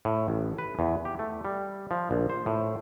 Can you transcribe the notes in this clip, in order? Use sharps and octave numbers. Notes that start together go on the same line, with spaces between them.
A2
A1
B4
E2
G4
A3
G3
F3
A#1
C5
A2